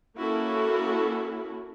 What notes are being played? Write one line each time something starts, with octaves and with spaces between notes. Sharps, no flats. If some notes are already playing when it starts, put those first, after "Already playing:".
A#3 C#4 E4 F#4 A4